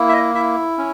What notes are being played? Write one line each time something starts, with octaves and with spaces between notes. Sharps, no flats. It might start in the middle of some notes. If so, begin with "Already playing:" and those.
Already playing: A#3 E4
E5
D#5
E4 E5
C#4